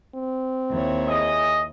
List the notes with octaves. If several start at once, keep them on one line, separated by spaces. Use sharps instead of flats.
C4
D#2 E4 C#5
G#4 D#5